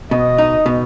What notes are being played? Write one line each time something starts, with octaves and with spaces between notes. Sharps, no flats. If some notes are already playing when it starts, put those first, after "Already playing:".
B2 D#5
D#4
B2